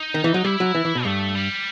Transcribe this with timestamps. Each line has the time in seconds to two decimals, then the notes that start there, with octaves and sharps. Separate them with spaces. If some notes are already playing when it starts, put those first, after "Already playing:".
Already playing: D#4
0.14 D#3
0.24 E3
0.34 F#3
0.44 G3 E4
0.60 F#3
0.75 E3
0.85 E3
0.95 B2
1.05 G2 A3
1.35 G3